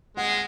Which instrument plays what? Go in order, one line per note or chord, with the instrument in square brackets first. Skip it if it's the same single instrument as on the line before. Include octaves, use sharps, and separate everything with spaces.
[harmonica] G#3 [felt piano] F#5